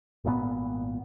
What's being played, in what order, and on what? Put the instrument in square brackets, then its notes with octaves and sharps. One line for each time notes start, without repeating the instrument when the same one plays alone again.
[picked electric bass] G#1 A#2 D#3 B3